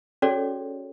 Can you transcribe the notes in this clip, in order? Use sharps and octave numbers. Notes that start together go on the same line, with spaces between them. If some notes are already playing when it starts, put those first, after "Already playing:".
C#4 F#4 G#4 A4 C#5 D5